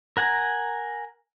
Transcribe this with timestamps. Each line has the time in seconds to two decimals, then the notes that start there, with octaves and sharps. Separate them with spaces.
0.17 A#4 F#5 G#5 A#5